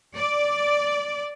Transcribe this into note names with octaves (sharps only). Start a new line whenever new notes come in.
D5